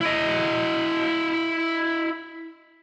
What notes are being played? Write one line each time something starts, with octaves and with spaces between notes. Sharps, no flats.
E4 D#5